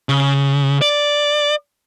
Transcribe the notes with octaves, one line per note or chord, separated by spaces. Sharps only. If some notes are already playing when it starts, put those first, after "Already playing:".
C#3
D5